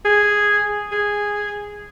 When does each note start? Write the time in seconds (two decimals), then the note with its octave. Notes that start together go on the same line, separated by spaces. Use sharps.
0.05 G#4
0.92 G#4